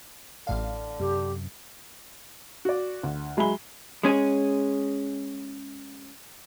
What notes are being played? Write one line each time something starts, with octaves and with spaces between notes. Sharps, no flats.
A1 A2 D3 F5
F#2 C3 G4
F#4 D5
D2
F#3 G#3 E5 G#5 B5 G7
G#3 C#4 G#4